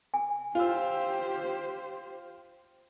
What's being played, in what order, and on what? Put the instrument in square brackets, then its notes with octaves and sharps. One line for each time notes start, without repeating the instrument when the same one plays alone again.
[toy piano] G#5
[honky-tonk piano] F4 E6 [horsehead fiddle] G4 C5